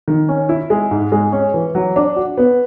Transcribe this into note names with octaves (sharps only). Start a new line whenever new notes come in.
D#3
C#4
E4
G#3
G#2
G#3
C#4
E3
F#3
D4
F#4
B3